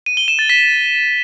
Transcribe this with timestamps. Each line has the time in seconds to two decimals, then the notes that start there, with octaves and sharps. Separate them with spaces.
0.06 D#7
0.17 G7
0.28 E7
0.39 A6
0.49 B6